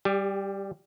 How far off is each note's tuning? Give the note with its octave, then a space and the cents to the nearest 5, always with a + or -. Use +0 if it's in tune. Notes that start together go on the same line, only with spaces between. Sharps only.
G3 +0 G4 +40